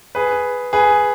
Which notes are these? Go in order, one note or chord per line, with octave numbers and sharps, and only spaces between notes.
G#4 B4
G#4 B4